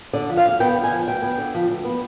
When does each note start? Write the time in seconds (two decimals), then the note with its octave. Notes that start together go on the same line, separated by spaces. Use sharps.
0.13 D3 D5
0.29 F3
0.37 F5
0.45 D2
0.60 B3 G5
0.76 D3
0.84 G#5
0.92 F3
1.08 D2 G5
1.22 B3
1.38 D3
1.54 F3
1.70 D2
1.85 B3